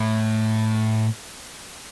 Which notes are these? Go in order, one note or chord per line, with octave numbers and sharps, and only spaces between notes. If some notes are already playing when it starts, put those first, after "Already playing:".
Already playing: A2